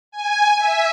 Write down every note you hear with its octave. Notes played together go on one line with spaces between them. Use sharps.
G#5
E5